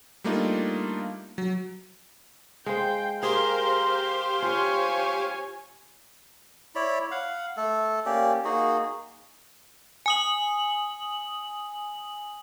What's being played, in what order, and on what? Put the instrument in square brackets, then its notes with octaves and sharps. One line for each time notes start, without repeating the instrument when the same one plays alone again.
[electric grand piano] G3 A3 A#3 D4 D#4 F4
F#3
[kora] G#3 C5 [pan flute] F5 [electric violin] G5
[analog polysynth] G4 C5 F5 [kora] G#4 [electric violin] A#4 [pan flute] C6
[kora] F4 [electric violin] C#5 G#5
[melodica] E4 C#5 D5 B5
F5 F#5
A3 A4
A#3 C#4 G4 D5
A#3 D#4 F#4 G#4
[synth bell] G#5 D#6 F#7